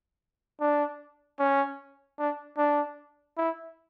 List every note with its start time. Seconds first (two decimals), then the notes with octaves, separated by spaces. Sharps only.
0.60 D4
1.39 C#4
2.19 D4
2.58 D4
3.37 E4